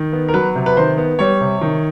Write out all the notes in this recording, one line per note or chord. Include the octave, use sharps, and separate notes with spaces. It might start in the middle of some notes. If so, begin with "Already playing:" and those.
Already playing: D#3
B3
A#4
F#3 B4
C3
B4
D#3 C5
B3
G3 C#5
C3
D#3